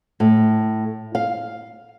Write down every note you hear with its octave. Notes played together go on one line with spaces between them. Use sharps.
A2
F5